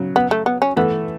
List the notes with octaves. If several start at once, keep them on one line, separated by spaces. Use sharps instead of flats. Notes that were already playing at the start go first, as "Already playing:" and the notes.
Already playing: C#3 F#3
B3
A3
B3
C#4
E3 A3 B3